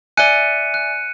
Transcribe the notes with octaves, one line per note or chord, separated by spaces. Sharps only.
D5 E5 G#5 F#6 C#7 D#7
F#6